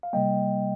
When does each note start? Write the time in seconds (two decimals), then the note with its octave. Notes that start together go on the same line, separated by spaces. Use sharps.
0.03 F5
0.13 C3 G3 A#3 D#5 G5